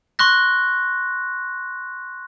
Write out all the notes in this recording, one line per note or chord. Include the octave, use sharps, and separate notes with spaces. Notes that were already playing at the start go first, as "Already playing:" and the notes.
C6 C#6 F#6 A#6